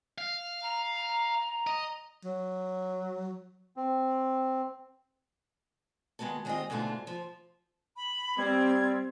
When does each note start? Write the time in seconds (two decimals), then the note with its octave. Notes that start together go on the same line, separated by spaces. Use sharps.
0.18 F5
0.62 A#5
1.67 D#5
2.25 F#3
3.76 C4
6.19 D#3 G#3 B3 F#4 A4
6.45 D#3 G#3 C4 F4 G4 D#5
6.70 G#2 B2 D3 A3 F4
7.07 F3
7.97 B5
8.38 G3 C4 G#6